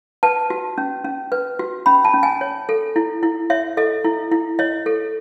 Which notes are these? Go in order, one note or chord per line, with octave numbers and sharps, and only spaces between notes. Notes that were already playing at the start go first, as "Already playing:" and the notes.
B4 A5
F#4
C#4
C#4
B4
F#4
C#4 B5
A5
C#4
G#5
C#5
A4
E4
E4
C#5 E5
A4 D#5
E4
E4
C#5 D#5
A4